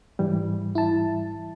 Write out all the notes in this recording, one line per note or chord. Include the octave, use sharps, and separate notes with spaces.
G#2 E3 G3
E4 A5